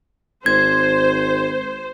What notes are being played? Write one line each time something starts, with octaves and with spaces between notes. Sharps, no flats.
G#1 C5 G#6